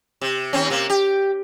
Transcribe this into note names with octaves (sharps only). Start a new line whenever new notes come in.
C3
D#2 C4 C#4
C3 A#3
G4